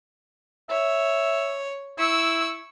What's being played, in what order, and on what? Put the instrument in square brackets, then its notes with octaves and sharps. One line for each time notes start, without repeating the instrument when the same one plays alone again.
[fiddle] C#5 [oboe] E5
[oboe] E4 [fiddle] C#6 E6